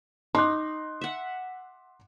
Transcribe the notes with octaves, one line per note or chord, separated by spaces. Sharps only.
D#4 C6 D6 F#6
E5 F#5